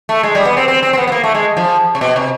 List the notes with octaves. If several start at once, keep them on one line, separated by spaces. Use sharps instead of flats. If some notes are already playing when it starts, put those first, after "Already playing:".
A3
G#3
G3
B3
C4
C4
C4
C4
B3
B3
A#3
A3
G#3
F3
C3
B2
C3